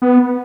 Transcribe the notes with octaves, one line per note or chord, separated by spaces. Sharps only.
B3